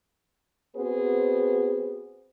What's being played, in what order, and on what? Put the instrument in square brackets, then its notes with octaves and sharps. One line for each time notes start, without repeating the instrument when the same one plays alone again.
[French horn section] B3 C4 F#4 G#4 B4 C5